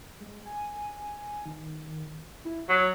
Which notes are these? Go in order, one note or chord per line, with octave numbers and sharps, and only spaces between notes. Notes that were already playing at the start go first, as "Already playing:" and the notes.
G#3
G#5
D#3
E4
F#3 G#6